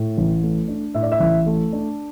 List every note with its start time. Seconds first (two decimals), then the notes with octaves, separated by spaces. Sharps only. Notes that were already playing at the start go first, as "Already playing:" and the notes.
Already playing: A2
0.18 A1
0.43 A3
0.68 D4
0.94 A2 E5
1.03 D5
1.12 E5
1.20 A1
1.46 A3
1.73 D4